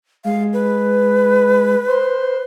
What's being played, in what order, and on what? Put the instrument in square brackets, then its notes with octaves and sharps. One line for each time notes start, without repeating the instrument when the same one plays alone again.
[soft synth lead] G#3 [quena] F5
[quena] B4
[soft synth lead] C5